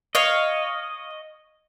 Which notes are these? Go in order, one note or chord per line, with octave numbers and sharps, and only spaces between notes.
C#5 D#5 F5